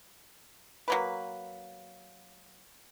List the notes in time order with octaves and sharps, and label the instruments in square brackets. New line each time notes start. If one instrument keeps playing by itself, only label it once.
[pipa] F#3 A#3 B4